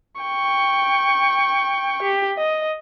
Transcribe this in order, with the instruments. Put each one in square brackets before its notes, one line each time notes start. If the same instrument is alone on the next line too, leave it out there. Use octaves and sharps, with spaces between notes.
[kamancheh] G5 C#6
G4
D#5